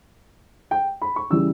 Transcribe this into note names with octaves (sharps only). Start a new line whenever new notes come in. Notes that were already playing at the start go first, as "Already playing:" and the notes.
G5
B5
C#6
C#3 E3 G3 E6